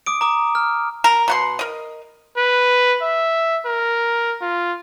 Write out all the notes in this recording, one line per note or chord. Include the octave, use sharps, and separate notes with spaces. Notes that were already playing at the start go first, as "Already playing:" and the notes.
D6 D#6 D7
A#5 D6 D#6
F6
A#4
B2 F#5 C6
A#4 D#5
B4
E5
A#4
F4